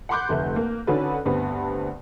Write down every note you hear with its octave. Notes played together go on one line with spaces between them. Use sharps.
F#5 B5 C6 D6 F#6 G6
F1 D2 A3
A#3
D3 C#4 D#4 F#4 A4 B4
D2 G2 B3 C4